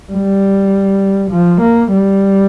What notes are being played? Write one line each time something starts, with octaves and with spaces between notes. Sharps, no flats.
G3
F3
A#3
G3